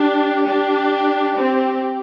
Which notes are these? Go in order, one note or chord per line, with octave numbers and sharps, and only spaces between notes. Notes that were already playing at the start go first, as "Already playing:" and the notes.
Already playing: D4 G4
D4
C4